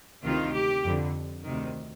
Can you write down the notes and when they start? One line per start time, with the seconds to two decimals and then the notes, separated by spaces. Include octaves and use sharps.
0.23 D2 C3 D#3 F4
0.53 G4
0.84 F2 D3
1.45 D2 C3 D#3